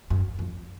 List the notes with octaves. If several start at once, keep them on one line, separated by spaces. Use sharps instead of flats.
F#2
F2